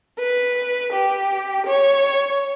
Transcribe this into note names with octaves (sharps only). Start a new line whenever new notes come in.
B4
G4
C#5